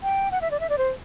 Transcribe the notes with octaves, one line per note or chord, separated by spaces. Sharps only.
G5
F#5
E5
D5
E5
D5
C5